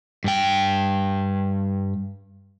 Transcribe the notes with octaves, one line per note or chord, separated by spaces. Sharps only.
G2 G5